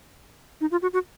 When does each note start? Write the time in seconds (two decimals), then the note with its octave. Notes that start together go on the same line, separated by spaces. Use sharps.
0.61 D#4
0.71 F4
0.82 F#4
0.93 F#4